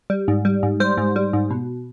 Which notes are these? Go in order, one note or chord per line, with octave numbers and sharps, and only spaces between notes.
G3
G#2
G3
G#2
G3 C5
G#2
G3
G#2
B2